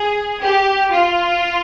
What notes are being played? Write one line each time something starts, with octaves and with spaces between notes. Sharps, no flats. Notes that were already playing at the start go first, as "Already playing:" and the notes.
Already playing: G#4
G4
F4